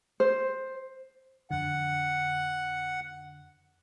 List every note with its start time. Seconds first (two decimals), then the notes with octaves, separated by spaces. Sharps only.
0.20 C5
1.51 F2 D3 F#5